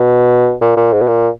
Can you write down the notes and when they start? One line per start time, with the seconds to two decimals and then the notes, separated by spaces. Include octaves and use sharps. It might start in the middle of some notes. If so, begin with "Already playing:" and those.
Already playing: B2
0.62 A#2
0.77 A#2
0.93 G#2
1.01 B2
1.08 A#2